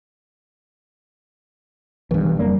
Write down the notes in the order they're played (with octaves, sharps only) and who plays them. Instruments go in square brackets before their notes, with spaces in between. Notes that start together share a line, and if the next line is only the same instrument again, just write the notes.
[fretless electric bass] B1 G2 [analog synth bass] E3
[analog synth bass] E3
[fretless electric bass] F#1 F2 A#3 [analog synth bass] G3